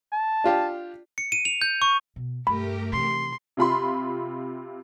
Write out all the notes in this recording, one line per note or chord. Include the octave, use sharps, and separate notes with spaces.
A5
D4 F4 G4
C#7
D#7
F7
G6
C#6
B2
G2 A3 G4 A#4 B5
C3 E3 C6
C3 F4 B5 C6